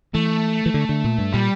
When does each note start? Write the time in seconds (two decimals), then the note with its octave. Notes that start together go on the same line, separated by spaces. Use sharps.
0.14 E3 A3
0.66 E3
0.74 D3
0.89 D3
1.04 A#2
1.18 G2
1.33 A#2 G3